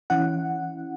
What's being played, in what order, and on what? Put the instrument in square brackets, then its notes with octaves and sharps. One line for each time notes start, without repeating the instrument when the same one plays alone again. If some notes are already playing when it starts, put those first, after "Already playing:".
[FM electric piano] E3 C#4 E4 F#5